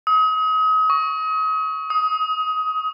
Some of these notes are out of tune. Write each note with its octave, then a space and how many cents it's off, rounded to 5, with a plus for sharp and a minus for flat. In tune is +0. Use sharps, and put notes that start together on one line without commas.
D#6 +35
C#6 +15
D#6 +20